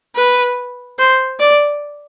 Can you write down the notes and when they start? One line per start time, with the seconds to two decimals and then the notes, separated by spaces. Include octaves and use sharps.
0.16 B4
0.99 C5
1.40 D5